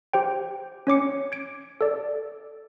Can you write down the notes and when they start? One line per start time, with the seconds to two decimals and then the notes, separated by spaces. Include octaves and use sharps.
0.13 G4 C5 G5
0.87 C#4 C#5 D6 C#7
1.32 G#6 D7
1.81 A4 D5